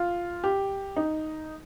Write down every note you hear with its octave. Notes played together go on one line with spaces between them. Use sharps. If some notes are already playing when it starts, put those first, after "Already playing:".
Already playing: F4
G4
D#4